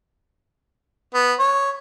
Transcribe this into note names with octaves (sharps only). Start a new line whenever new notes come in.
B3
C#5